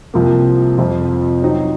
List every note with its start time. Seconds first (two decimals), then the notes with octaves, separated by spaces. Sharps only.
0.14 C2 C3 F3 A#3
0.78 F2 C3 F3
1.42 F#3 C4 D#4